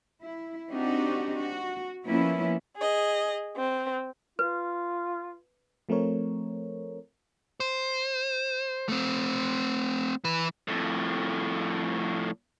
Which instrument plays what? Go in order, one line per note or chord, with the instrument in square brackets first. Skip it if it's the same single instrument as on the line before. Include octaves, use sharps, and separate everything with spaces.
[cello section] E4
C4 D4 D#4 F#4 G4
F#4
F3 A#3 B3 C#4 E4
[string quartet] G#4 D#5
C4
[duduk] F4 [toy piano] B4
[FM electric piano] F3 A3 C4 A#4 C#5
[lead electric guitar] C5
A3 C4
E3 B4
F2 A2